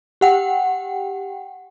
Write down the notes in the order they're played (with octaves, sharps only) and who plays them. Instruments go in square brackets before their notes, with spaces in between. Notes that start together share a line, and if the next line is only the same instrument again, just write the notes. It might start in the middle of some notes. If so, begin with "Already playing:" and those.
[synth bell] G4 F#5 G5